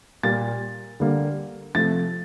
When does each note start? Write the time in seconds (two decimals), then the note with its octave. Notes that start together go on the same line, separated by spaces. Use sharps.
0.23 A#2 G3 A#3 A6
1.00 D3 G3 A#3
1.75 C3 F3 A3 A6